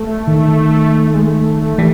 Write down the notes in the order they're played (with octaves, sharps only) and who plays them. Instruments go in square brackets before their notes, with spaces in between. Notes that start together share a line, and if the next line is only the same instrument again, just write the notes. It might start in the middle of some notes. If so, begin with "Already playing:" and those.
Already playing: [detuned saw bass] A3
[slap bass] D#3
[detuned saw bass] A3
G#3
A3
[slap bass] E3 [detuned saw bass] G3